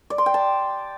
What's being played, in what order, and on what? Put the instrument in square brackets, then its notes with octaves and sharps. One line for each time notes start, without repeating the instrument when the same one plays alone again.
[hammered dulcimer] D5
C6
G5
A5